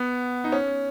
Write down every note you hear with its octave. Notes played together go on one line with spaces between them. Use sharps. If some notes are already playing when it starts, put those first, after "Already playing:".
Already playing: B3
D#4
C#4